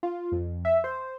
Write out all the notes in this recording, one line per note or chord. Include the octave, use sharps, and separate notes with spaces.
F4
F2
E5
C5